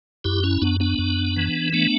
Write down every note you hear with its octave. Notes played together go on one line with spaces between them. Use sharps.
F#2 E4 G4
C#4 E4
F#2 B3 D4
B3 D4
F#2
E3
A3 B3 D4